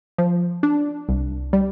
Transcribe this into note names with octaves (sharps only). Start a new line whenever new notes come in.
F3
D4
C2
G3